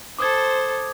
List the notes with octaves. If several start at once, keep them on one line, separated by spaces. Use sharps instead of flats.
A4 C5 D6 D#6 G#6